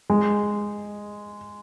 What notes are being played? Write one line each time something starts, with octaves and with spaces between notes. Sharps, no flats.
G#3